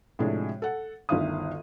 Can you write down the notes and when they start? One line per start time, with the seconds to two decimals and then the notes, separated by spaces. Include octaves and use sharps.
0.19 A2 C3 F3 G#3 D4 G#4
0.62 A4 F#5
1.09 G1 D2 D#3 E5 F5 D#6